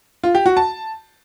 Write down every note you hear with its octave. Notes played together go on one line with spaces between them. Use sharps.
F4
G4
F#4
A5